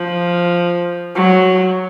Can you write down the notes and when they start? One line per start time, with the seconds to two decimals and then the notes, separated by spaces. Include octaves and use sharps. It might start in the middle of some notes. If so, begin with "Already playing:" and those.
Already playing: F3
1.15 F#3